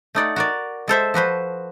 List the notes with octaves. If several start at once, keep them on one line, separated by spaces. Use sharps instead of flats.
A3 D#4 D5 F#5
F#4 A#4 D5
G#3 A4 C5 E5
F3 F#4 B4 C5